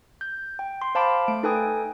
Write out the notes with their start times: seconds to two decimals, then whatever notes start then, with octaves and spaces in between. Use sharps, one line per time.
0.21 G6
0.59 G5
0.82 C6
0.95 C5 F5 A5 B5 D6 D7
1.28 A3 D7
1.43 D#4 A4 B4 G5 G#5 D#6